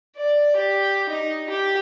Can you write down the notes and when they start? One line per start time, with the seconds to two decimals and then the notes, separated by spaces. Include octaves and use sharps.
0.16 D5
0.56 G4
1.09 D#4
1.49 G4